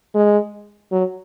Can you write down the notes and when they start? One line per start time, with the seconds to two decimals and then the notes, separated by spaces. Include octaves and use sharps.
0.14 G#3
0.92 F#3